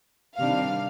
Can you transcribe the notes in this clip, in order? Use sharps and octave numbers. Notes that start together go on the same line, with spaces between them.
C3 D#3 G3 D4 F5